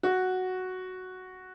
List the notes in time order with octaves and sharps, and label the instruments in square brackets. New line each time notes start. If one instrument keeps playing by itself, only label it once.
[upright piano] F#4